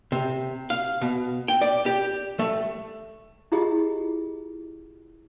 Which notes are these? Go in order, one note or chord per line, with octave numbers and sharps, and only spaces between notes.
C3
F5
B2
G5
D5
G4
A3
E4 F4 G4 G#4 D#5